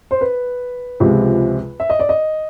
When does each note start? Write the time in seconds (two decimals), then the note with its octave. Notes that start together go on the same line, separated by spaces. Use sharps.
0.11 C5
0.21 B4
1.00 C#2 C3 F3 G#3
1.80 E5
1.90 D#5
1.99 D5
2.09 D#5